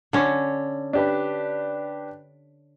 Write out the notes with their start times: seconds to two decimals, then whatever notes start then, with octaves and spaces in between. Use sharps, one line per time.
0.13 D3 C#4
0.93 D4 G4 B4